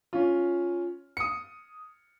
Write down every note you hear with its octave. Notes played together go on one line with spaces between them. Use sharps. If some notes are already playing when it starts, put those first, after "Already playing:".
C#4 F4
D#6 C#7